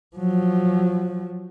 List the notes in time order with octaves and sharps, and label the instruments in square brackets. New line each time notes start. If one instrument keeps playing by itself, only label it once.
[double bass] F3 F#3